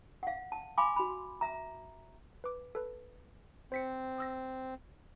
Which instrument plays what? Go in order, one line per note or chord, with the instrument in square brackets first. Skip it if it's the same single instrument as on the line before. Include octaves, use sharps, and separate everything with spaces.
[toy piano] F5 F#5
A5
F5 G#5 B5 C6 D6
F#4 B5
E5 A#5
[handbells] B4 D6
A4 B4
[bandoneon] C4 [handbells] C5 B6 C#7
[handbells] D#6 E6 A#6